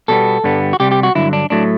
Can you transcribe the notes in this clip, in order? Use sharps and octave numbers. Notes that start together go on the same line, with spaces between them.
B2 G3 B3 A4
G2 D3 G3 B3
F#4
C2 C3 G3 G4
G4
F#4
G2 D3 F#3 E4
D4
A2 F#3 A3 D4